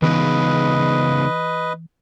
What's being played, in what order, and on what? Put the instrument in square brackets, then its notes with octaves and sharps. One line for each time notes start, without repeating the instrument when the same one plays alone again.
[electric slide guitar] C#3 B3 D#4 [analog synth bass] E3 [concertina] B4 D#5